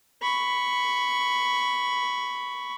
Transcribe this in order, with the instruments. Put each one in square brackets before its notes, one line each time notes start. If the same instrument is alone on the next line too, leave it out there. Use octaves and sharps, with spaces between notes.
[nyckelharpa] B5 C#6